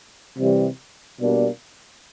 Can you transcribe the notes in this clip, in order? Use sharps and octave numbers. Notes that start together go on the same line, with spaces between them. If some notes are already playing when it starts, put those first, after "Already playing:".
C3 E3 G3
B2 G3 A#3 D4